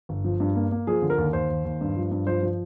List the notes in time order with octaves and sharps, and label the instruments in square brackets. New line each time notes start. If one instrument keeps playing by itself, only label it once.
[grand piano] G1
F3
G2
A#3
A#3
F3 G#4
D3
A#4
D#2
D#2 C5
D#2
D#2
G2
F3
G2
F3 C5
F3